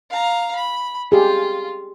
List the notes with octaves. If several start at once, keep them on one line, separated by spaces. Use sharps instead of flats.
F5 A#5
B5
F4 G4 G#4